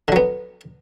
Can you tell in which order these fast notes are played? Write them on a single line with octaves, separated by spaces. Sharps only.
D3 F#3 B3